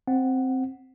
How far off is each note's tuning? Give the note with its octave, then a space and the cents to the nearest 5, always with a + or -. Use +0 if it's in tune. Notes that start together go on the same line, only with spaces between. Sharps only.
C4 +0 F#5 +0